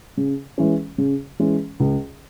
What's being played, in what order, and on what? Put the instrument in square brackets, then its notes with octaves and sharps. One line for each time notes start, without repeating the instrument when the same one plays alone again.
[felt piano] C#3
E3 G#3 C#4
C#3
E3 G#3 C#4
C#2